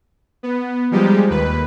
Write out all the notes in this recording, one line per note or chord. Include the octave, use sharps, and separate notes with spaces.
B3
F3 G3 G#3 D#4 G4
D#2 B4